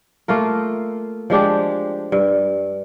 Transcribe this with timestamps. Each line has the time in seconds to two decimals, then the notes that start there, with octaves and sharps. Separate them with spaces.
0.28 A3 A#3 F4 A#4
1.30 F3 G#3 D4 G4
2.12 G2